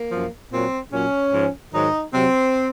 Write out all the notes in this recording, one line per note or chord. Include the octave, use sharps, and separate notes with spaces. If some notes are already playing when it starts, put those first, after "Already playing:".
Already playing: A#3
F#2 F3
A#2 F#3 C4
A#2 F#3 C#4
G#2 F3
G#2 D#3 F#3 D#4
C3 F#3 C4